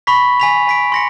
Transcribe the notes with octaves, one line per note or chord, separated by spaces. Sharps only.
B5 C#6 A#6 B6
G#5 B6 F7
G#5 B6 D7
C6 A#6 C#7